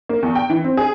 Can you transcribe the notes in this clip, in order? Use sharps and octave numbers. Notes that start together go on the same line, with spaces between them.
A#3
E2
G5
E3
C4
G#4